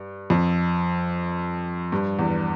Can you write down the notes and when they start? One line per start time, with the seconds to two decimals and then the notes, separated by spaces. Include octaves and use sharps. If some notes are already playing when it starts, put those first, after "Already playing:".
Already playing: G2
0.30 F2
1.92 G2
2.19 E2